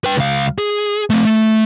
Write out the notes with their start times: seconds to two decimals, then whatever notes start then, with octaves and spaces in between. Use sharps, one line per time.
0.04 B4 G5
0.17 C#2 F5
0.58 G#4
1.10 A3 C4
1.25 A3